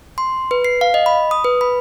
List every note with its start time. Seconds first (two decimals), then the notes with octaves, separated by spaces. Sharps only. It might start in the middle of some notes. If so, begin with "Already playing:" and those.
0.18 C6
0.51 B4
0.65 C7
0.81 F5
0.94 D#5
1.06 B5
1.31 D#6
1.44 B4
1.61 B5